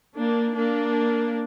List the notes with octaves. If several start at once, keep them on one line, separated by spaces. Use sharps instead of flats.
A#3 D4
A#3 D4